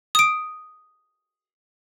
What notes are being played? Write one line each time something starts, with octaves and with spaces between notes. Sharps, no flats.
D#6 D7